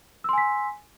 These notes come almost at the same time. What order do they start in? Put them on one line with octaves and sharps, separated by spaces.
E6 C6 G#5 B6